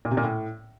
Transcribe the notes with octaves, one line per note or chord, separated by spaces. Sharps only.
A#2
C3
A#2
A2